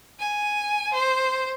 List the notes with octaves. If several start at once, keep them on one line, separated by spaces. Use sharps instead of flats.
G#5
C5